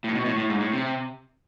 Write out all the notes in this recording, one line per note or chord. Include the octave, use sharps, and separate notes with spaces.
A2
B2
A2
A2
G#2
A2
C3